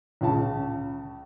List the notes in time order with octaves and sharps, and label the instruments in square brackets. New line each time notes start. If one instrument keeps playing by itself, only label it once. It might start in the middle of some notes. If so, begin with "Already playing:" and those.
[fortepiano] C#2 C#3 A5